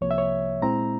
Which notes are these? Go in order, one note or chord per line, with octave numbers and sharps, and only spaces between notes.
C2 C3 F3 A#3 C#5
E5
C#5
A#2 G#3 C4 E4 A#5